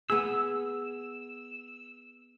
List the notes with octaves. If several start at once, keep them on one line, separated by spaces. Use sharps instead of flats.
B3 G#4 E6